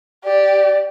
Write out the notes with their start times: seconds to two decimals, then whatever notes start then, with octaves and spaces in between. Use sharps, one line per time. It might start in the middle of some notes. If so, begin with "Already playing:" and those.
0.24 G4 D5